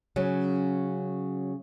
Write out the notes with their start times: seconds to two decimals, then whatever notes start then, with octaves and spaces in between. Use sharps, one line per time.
0.16 C#3 F#3 C#4